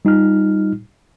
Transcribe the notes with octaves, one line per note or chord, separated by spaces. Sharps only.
G3 D#4 F4 F6